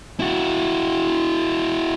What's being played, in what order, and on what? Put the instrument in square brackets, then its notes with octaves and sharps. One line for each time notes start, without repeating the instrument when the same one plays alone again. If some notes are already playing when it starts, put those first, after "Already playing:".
[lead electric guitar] E4 F#4